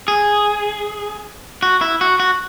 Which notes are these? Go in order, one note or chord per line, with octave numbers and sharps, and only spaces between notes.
G#4
F#4
E4
F#4
F#4